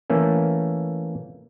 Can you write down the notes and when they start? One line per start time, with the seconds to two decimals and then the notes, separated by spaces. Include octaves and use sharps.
0.10 E3 A3 A#3 C#4